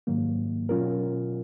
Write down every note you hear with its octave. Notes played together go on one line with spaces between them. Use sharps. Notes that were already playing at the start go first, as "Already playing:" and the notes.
G#2 D#3 F#3 A#3
B2 F#3 C#4 F4 A#4